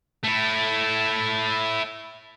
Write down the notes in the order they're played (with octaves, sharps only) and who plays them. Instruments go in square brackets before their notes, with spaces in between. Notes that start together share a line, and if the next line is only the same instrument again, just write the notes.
[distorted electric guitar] A3 E4